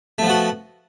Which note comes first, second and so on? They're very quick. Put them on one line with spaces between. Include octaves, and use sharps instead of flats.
A3 F3 B3 F#4